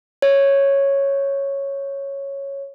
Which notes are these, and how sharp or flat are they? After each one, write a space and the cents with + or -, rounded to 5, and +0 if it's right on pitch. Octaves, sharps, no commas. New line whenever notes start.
C#5 -5